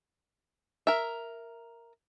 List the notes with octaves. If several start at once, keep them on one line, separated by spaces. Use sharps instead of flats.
A#4 E5